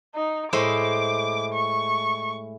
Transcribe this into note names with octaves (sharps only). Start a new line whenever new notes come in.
D#4
A2 G#3 C5 D6
C#6